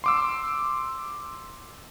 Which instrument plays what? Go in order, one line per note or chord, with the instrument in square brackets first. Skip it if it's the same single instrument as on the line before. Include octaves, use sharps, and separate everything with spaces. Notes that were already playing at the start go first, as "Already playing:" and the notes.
[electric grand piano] C6 D6 E6